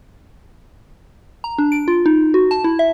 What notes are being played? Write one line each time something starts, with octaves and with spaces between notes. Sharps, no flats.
A#5
D4
D7
F4
D#4
F#4
A5
E4
E5